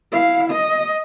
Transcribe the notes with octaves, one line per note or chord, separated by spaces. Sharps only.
E4 F5
D#5